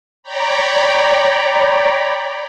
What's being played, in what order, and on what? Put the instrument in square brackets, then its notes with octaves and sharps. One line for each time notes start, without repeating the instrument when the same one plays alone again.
[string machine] C#5 D5 G5 A#5 B5